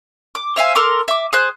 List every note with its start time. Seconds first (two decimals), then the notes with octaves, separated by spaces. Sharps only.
0.35 D6
0.56 C5 E5 F5 G#5
0.75 A4 A#4 C6 D6
1.08 E5 D6
1.33 G#4 C5 F#6